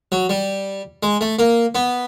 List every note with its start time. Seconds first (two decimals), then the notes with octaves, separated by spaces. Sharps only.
0.12 F#3
0.29 G3
1.03 G#3
1.21 A3
1.39 A#3
1.75 B3